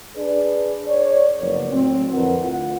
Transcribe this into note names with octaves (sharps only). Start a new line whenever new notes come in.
D4 G#4 B4 D5
C#5 D5
F#1 F3 B3 A#4 C#5 D5
A2 F#3 C4
F2 D3 E4 A#4 B4 F#5
D2 F4 F#5